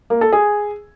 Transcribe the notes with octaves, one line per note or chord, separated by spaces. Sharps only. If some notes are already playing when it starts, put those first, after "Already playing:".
A#3
A4
G#4